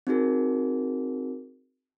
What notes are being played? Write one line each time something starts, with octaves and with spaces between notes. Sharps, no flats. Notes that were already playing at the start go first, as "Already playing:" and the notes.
C4 D#4 F#4 G#4 A#4